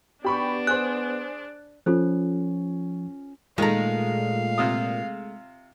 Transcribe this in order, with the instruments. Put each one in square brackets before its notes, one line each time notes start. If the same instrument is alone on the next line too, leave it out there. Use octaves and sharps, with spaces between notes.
[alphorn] B3 [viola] D4 [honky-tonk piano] G4 B5 C#6
[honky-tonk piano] G#4 C5 [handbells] F#6
[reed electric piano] F3 [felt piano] C#4 [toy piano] F4 A4 C5
[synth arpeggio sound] A#2 [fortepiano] D#3 A#5 [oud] G#3 A3 [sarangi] F5
[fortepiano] C3 F4 D#6